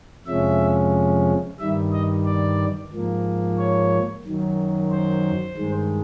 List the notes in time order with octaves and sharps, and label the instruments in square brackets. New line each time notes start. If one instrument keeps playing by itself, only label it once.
[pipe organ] F2 C3 F3 G#3 C#4 E5
G2 D#3 G3 E5
D#5
D5
G#2 F3 A#3
C#5
F#2 D#3 F#3
C5
G2 D#3 G#3